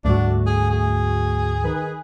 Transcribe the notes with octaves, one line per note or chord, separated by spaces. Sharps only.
D2 G#2 G3 A3 D4 F#4
G#4
G#4
D#3 B4